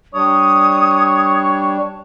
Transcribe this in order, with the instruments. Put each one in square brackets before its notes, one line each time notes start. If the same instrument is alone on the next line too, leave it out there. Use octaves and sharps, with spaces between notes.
[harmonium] G3 D4 [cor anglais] C#5 [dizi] D#6